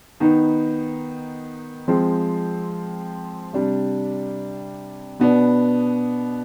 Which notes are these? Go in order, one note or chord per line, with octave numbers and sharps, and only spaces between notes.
D#3 B3 D#4
F3 G#3 C4
C3 G3 D4
B2 B3 D4